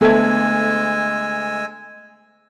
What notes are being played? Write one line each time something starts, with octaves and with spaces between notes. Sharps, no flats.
D2 G#3 B3 A4 E5 G#5 E6 G#6